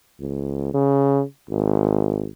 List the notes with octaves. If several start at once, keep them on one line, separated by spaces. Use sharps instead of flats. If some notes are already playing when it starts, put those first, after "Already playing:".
C#2
C#3
G#1